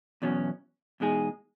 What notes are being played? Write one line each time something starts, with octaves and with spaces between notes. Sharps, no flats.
E2 B2 F#3 C#4
E2 B2 G#3 D#4 G#4